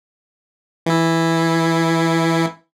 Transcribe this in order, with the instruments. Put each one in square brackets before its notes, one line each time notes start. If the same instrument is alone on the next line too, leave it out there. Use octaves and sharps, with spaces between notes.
[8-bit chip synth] E3 E4